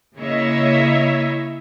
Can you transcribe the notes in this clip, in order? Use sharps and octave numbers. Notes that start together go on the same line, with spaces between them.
C#3 A#3 E4 C#5 D#5 E5